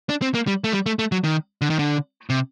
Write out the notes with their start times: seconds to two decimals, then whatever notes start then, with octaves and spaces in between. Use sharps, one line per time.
0.09 D4
0.22 C4
0.35 A#3
0.47 G3
0.64 A3
0.73 G3
0.86 A3
0.99 A3
1.12 F#3
1.24 D#3
1.61 D3
1.70 D#3
1.79 D3
2.30 C3